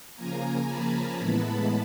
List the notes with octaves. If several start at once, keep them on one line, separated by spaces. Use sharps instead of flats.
C#3 F3 A#3 G#5 A#5
A5 B5
A2 E3 G#3 B3